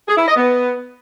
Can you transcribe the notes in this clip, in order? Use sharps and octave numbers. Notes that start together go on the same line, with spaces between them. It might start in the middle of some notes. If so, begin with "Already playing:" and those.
G#4
E4
D#5
B3